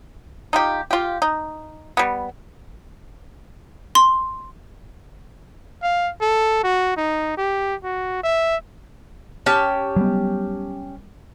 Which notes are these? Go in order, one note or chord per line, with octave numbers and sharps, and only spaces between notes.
D#4 F4 G4
F4 G4
D#4
G3 B3
C6
F5
A4
F#4
D#4
G4
F#4
E5
C#4 G4 A5
F#3 G3 B3